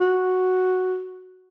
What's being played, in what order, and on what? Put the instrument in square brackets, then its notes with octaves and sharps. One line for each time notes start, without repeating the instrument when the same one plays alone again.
[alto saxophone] F#4